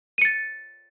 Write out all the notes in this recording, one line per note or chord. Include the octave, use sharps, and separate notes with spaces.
A6 C#7 D#7